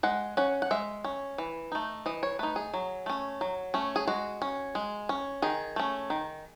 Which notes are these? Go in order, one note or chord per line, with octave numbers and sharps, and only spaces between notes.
G#3 F#5
C#4 F#5
F#5
G#3 E5
C#4
E3
A3 D#4
E3 D#5
C#5
A3 D#4 B4
G#4
F#3
A3 C#4
F#3
A3 C#4
G#4
G#3 F#4
C#4
G#3
C#4
D#3 G#4
A3 C#4
D#3